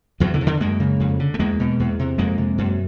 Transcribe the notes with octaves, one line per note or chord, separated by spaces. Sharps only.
E2 E3 F#3
D3 E3
C3
D3 E3
F#2 G#3 A#3
C#3
F2
D3
A3
E2 G#3 A#3
B2
E2
C3
F2 G#3 A#3
C3
F#2